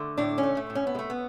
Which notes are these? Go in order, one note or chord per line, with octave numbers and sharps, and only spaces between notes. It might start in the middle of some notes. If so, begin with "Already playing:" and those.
Already playing: D3 A3
A2 D4
C#4
A3
A3
A2
C#4
B3
G#3
A3
B3